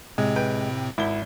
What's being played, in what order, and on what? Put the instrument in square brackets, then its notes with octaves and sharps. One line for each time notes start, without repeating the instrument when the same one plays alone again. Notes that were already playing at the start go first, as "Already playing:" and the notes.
[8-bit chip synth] A2 C3 C4 [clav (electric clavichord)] G#3
[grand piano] B4 G5
[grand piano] G#1 G7 [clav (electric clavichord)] E4